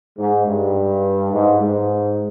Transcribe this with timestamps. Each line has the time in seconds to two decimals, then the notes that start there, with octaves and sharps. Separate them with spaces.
0.18 G#2
0.46 G2
1.32 G#2
1.60 G#2